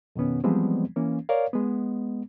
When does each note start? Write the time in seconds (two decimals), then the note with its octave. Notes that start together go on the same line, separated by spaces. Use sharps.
0.16 F2 B2 D#3 B3 C#4
0.44 E3 F3 G3 G#3 B3 C4
0.96 E3 A#3 C#4
1.29 A#4 C#5 D5 F5
1.53 G#3 B3